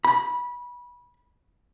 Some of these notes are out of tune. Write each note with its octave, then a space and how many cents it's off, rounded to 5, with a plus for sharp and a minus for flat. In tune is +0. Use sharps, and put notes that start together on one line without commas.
B5 -20